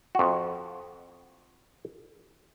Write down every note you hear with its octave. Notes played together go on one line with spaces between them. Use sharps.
F2 F#4